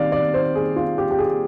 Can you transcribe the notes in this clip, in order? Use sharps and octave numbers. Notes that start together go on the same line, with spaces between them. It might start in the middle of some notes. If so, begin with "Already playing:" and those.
Already playing: C3 D#3 G3 D5 F5
D5
C5
G#4
F4
G4
G4
G#4